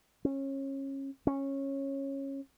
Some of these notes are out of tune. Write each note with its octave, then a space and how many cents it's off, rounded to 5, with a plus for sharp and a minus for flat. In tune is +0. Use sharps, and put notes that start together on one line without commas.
C#4 -25
C#4 -15